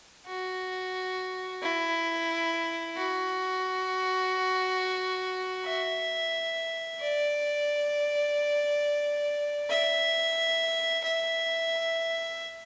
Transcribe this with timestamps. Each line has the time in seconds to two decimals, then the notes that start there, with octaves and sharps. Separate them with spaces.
0.27 F#4
1.62 E4
2.96 F#4
5.65 E5
7.00 D5
9.69 E5
11.04 E5